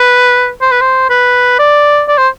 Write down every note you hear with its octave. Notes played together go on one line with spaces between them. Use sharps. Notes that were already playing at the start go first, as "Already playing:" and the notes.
Already playing: B4
C5
B4
C5
B4
D5
D5
C5